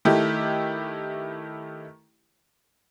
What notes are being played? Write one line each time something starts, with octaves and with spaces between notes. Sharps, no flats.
D#3 A3 E4 G4